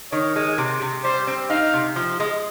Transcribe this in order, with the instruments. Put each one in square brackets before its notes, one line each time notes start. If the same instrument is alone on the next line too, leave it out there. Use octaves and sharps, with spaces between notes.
[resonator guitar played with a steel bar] D#3 [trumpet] C#5
[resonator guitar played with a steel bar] G#3
C3
C3
[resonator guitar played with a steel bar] G3 [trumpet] C5
[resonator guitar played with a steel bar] C4
[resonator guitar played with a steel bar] D#4 [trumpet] F5
[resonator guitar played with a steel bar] C3
F3
G#3